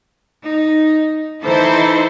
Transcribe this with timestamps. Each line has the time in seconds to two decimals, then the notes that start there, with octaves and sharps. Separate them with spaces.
0.43 D#4
1.43 E3 D#4 E4 A4 C5